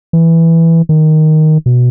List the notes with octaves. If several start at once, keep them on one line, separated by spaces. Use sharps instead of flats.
E3
D#3
B2